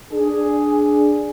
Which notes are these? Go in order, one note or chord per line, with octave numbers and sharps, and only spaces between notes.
D4 G#4